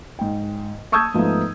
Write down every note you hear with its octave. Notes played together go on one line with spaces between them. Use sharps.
G#2 G5
A5 C#6 D#6 E6 G6 G#6
G#2 F3 A3 B3 D#4